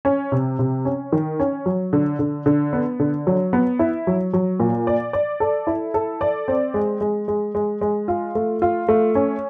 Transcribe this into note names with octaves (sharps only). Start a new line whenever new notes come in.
C#4
C3
C3
C#4
D#3
C#4
F#3
D3
D3
D3
B3
D3
F#3
B3
E4
F#3
F#3
A#2
D5
D5
A4
E4
A4
D5
C4
G#3
G#3
G#3
G#3
G#3
F4
A3
F4
A3
C#4